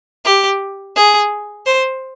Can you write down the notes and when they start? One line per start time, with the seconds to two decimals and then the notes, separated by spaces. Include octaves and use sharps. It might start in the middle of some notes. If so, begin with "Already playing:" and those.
0.25 G4
0.96 G#4
1.66 C5